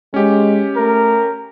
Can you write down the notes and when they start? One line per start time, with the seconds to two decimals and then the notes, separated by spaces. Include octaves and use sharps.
0.14 G#3 C#4 G4
0.76 A3 A#4